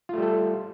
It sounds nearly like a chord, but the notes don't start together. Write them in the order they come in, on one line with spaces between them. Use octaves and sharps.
F4 A3 G3 A4